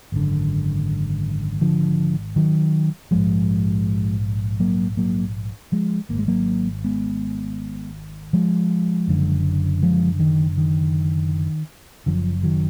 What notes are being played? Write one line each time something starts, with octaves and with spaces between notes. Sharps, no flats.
G#1 F#2 D3
D3 F3
D#3 F#3
A#1 G#2 F3 G#3
F#3 A#3
F#3 A#3
F3 G#3
G#1 G#2 A#3
G#3
F#3 A#3
G#3 B3
F3 G#3
F#1 F#2 D3
F3 G#3
D#3
D#3
F#1 F#2 D3 F3
D#3 F#3